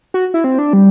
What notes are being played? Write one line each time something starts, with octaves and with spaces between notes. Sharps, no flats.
F#4
E4
C4
D4
G3